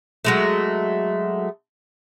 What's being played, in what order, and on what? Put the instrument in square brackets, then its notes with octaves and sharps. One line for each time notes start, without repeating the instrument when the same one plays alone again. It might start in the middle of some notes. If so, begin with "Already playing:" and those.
[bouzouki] F#3 G#3 A3